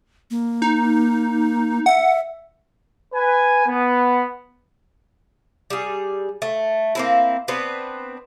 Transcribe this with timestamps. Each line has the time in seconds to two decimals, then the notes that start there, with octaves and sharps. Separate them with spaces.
0.31 A#3
0.62 D#4
1.86 E5 F#5
3.14 B4 G#5
3.67 B3
5.70 G3 G#4
6.42 A3
6.95 A#3 C4 E4
7.48 B3 C4 D4 B4